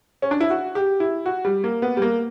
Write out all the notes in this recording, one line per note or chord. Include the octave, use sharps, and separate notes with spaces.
C#4
D4
E4
F#4
G4
E4
F#4
G3
A#3
B3
G3
A#3